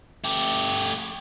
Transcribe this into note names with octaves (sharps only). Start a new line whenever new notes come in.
A3 G4